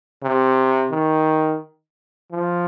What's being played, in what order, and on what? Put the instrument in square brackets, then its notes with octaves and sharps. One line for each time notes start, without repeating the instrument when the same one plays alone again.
[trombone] C3
D#3
F3